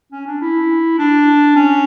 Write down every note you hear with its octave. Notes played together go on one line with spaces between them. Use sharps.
C#4
D4
E4
D4
C#4